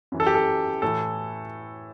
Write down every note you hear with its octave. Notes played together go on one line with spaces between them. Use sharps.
F#2 E3
A4
G4
A4
A2 E3 A4